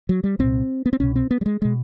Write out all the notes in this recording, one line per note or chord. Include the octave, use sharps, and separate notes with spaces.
F#3
G3
C2 A#2 C4
B3
C4
C2 B2 C#4
C4
B3
G3
G#3
B2 G#3